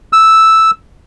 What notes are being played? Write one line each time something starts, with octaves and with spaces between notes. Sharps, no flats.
E6